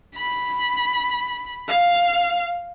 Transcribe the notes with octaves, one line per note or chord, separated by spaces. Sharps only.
B5
F5